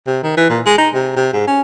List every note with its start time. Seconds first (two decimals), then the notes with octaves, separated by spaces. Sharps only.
0.07 C3
0.24 D#3
0.37 E3
0.50 A#2
0.66 G#3
0.79 D#4
0.95 C3
1.17 C3
1.33 G#2
1.47 C#4